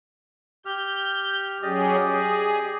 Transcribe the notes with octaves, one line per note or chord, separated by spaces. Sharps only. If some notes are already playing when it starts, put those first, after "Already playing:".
G4 F6 G6
F#3 C#4 G4 G#4 D5 D#5
G#4